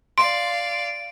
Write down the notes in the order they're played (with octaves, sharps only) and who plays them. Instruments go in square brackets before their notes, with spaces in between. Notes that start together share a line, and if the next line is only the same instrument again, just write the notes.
[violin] D5 F5 [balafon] C6 [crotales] D7